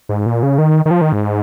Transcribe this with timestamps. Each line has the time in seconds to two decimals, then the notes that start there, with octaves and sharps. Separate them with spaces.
0.09 G#2
0.26 A#2
0.43 C#3
0.58 D#3
0.85 D#3
0.91 F3
1.01 D#3
1.12 G#2